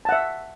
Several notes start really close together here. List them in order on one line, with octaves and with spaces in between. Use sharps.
A5 F#5 E5